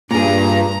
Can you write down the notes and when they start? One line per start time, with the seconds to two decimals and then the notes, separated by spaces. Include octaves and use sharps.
0.11 G2 A#2 G#4 A#5